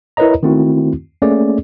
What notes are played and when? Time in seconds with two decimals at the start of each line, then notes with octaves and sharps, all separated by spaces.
0.17 E4 A#4 B4 C#5 D#5 A#5
0.43 D#3 A3 C4 E4 F#4
1.22 A3 A#3 C#4 G#4 D5